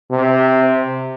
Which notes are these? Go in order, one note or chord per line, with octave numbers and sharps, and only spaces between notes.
C3